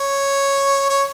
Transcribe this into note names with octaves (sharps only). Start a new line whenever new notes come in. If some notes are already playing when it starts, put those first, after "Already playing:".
Already playing: C#5
C#5